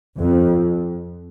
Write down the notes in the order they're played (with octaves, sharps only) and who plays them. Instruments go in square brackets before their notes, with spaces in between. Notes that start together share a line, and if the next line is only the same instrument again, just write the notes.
[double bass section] F2